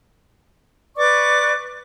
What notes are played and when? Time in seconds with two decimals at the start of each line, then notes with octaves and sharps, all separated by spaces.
0.96 B4 D5 C#6 D6